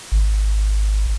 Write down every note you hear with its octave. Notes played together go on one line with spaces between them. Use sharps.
G#1